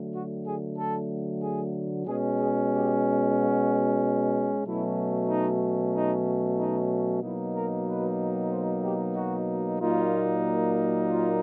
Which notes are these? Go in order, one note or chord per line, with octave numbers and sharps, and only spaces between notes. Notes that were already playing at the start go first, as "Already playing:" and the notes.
Already playing: D3 F#3 A3
F#4
G#4
A4
G#4
B2 G#3 C#4 G#4
G#4
G4
F#4
B2 F#3 A3 C#4 E4
D#4
D#4
D#4
B2 F#3 A#3 D#4 E4
A#4
B4
C5
G4
F#4
A#2 F#3 A#3 D#4 F4
F4